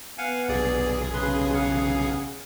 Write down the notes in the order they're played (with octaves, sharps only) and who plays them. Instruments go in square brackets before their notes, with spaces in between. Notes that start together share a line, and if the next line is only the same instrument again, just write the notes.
[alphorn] B3 [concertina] F5 F#5 G#5
[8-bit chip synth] B1 G#4 [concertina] D5
[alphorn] C#3 [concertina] B4 C6
[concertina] F5 F#5